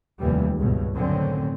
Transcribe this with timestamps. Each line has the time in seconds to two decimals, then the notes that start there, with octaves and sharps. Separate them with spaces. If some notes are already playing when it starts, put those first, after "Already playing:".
0.20 F1 D#2 E3 G3
0.57 C#2 G2 B2
0.95 F#2 A2 D3 D#3 C4 C#4